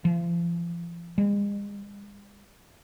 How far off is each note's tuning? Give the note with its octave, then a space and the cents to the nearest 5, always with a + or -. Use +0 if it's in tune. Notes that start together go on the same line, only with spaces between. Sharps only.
F3 -40
G#3 -45